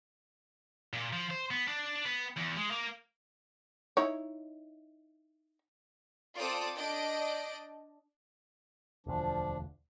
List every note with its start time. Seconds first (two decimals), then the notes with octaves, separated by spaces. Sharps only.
0.93 A#2
1.13 F3
1.31 C5
1.51 B3
1.68 D4
2.05 B3
2.37 E2
2.58 G#3
2.72 A#3
3.97 D#4 E4 C#5
6.38 C4 F4 A4 D5 D6 D#6
6.77 D4 D5 D#5 G6 D7
9.06 E1 D2 F3 D4